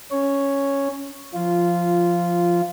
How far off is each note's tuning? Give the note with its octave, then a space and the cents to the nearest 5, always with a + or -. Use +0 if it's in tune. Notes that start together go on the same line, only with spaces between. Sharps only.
C#4 +0 C#5 +0
F3 +0 F4 -10